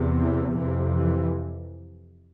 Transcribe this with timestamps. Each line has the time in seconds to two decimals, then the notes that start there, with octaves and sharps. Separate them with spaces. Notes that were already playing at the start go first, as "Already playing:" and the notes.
Already playing: E2 C3
0.18 E3
0.55 F2 C3 E3
0.94 E3